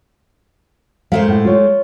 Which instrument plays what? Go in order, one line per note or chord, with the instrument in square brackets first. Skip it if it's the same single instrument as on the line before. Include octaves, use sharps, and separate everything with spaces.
[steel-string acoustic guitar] G#3 A3 C5 [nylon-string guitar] A#4 E5 F5
[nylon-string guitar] A2 F#5
F4 C#5